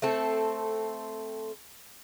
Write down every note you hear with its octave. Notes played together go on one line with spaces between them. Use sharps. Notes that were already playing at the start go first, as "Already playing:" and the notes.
A3 C4 A4